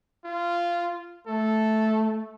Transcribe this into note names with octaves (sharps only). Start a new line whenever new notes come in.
F4
A3 A4